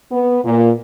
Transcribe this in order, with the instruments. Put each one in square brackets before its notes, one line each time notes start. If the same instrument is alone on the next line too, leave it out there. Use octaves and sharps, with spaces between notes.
[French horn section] B3
A#2